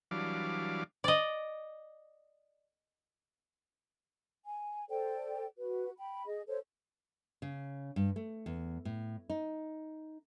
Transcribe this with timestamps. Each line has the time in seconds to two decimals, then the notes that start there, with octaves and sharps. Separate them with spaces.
0.11 E3 F#3 G3 D4 F5 D6
1.04 D5 D#5
4.45 G#5
4.90 A4 C5 D5 G5
5.58 F#4 B4
5.98 G5 B5
6.25 G#4 D#5
6.48 A4 C5 C#5
7.42 C#3
7.96 G2
8.16 A3
8.46 E2
8.85 A2
9.30 D#4